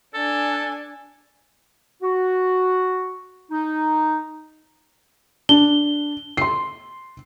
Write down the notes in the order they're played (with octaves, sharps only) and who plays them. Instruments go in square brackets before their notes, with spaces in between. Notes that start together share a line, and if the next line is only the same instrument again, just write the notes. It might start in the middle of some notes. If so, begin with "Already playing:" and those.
[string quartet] D4 G#5 [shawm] A4
[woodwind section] F#4
D#4
[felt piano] D4 [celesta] G7
[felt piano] C6 C7